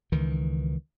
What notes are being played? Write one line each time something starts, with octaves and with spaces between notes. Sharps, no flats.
C#2 D#3 E3